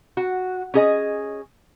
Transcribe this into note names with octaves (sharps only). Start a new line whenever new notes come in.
F#4
C#4 G#4 D#5